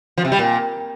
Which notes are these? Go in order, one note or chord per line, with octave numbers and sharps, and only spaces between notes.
F3
C3
G3
A#2